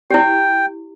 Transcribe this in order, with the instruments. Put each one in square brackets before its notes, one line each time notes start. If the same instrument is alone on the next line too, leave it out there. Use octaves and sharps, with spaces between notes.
[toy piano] E4 G4 [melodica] G5